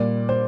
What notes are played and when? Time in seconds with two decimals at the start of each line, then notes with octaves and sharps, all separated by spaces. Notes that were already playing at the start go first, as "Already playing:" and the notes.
Already playing: A#2 G3 D5
0.29 C5